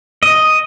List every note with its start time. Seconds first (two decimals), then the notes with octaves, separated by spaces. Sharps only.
0.23 D#5